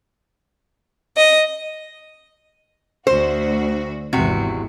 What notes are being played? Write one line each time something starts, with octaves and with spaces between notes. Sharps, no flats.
D#5
D2 F#4 C5
G#1 E2 G#2 C3 F#4